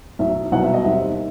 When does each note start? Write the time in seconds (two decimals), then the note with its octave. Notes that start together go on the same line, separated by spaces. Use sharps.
0.19 B1 A2 F#3 E5
0.52 C2 B2 F#3 B3 E4 F#5
0.62 E5
0.74 D#5
0.84 D#2 D#3 G3 C4 E5